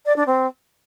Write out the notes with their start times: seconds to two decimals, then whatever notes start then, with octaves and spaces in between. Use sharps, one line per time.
0.06 D5
0.16 D4
0.27 C4